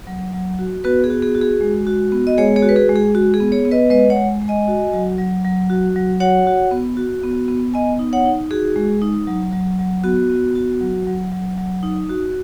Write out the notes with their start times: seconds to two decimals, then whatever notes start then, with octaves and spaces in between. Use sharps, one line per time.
0.07 F#3
0.33 F#3
0.59 F#4
0.84 B3 F#4 B4
1.04 G#4
1.10 F#4
1.22 G#4
1.35 F#4
1.41 G#4
1.61 G#3
1.87 F#4
2.12 B3
2.27 D#5
2.38 G#3 G#4 C#5
2.56 G#4 C#5
2.62 F#4
2.69 B4
2.76 G#4
2.89 G#3
2.96 G#4
3.14 G#3 F#4
3.34 G#4
3.40 B3
3.52 G#4 C#5
3.65 B3
3.71 B4 D#5
3.90 G#3 B4 D#5
4.10 C#5 F#5
4.17 G#3
4.42 G#3
4.48 D#5 G#5
4.68 F#4
4.93 F#3
5.18 F#3
5.45 F#3
5.70 F#4
5.96 F#3
6.20 F#4 C#5 F#5
6.47 F#4
6.71 B3
6.97 F#4
7.24 B3
7.48 B3
7.74 B3 D#5 G#5
7.99 D#4
8.13 C#5 F#5
8.25 D#4
8.51 F#4 G#4
8.76 G#3
9.02 D#4
9.28 F#3
9.53 F#3
9.79 F#3
10.04 B3 F#4
10.30 B3
10.56 F#4
10.80 F#3
11.07 F#3
11.32 F#3
11.58 F#3
11.83 D#4
12.09 F#4